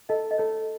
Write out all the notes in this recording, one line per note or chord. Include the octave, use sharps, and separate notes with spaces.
A4 D#5
D#5
A4 C#5